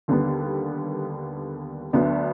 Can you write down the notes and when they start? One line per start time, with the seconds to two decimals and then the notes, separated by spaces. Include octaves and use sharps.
0.08 D#2 D3 G3 B3
1.93 D2 D3 F#3 B3 D4